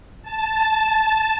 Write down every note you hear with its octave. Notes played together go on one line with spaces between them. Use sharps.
A5